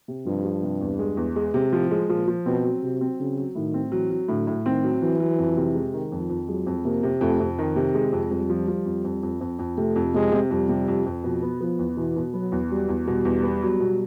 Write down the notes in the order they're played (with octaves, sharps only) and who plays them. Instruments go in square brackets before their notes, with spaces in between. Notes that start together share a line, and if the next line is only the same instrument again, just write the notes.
[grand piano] C3
[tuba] G2 [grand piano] F3
[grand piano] F3
C3
E2
G#3
E2
G#3
C3
[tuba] A2 [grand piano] F3
[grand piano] G#3
[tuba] A#2 [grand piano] F3
[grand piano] F3
[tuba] B2 [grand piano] C4
[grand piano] F#3
[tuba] C3 [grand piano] F#3
[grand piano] C4
[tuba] C#3 [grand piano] F#3
[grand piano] F#3
[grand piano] A2 [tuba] D#3
[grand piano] C4
[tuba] E3 [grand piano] F#3
[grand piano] F#3
[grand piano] A2 [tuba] D3
[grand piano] A2
[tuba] D#3 [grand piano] C4
[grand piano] F#3
[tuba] E3 [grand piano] F#3
[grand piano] F#3
F2
C3
G#3
D#3
[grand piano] F2 [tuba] F3
[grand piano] F2
[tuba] F#3 [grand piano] G#3
[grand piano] F2
[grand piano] C3 [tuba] A#3
[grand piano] C3
[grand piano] F2 [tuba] A3
[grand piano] F2
D#3
C3
G#3
F2
[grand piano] F2 [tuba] G3
[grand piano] F3
F3
F2
F2
F2
F2
F2
[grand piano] C3 [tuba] A3
[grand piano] F2
[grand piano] C3 [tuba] G#3
[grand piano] C3
[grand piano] F2 [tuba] G3
[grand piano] C3
F2
F2
[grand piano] B2 [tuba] F3
[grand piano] B3
[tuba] F3 [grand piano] B3
[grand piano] E2
[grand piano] B2 [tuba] E3
[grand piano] B2
[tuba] F#3 [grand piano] B3
[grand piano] E2
[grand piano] F#3 [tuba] G3
[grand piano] E2
[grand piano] B2 [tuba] G3
[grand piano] E2
B3
F#3
B2